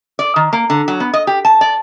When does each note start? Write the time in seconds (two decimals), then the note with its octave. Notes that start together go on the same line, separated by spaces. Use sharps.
0.19 D5
0.36 D#3
0.53 A#3
0.70 D3
0.88 F#3
1.00 B3
1.14 D#5
1.27 G4
1.45 A5
1.61 D5